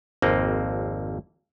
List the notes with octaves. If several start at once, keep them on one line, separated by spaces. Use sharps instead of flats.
G#1 F2 A#3 C4